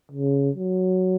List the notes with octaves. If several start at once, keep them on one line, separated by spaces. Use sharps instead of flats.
C#3
F#3